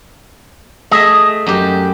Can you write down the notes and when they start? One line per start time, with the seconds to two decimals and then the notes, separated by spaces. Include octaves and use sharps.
0.91 A3 G#4 D#5 E5
1.46 F#2 G4